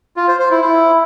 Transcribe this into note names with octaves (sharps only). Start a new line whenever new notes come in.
F4
C5
C5
E4
E4